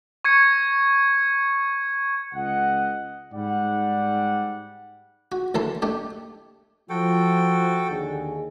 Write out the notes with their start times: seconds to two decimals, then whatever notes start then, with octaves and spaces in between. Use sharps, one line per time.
0.25 C#6 G#6 C#7
2.34 C#2 D#5 F#5
3.34 G#2 G3 D5 F#5
5.32 F#4
5.55 D2 E3 A4 A5 C6
5.82 A3 D4 G4
6.89 F3 F#4 A4 G5
7.88 D#2 D3 G#4